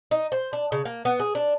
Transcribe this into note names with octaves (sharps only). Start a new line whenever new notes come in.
D#4
C5
D4
C#3
A#3
B3
G#4
D4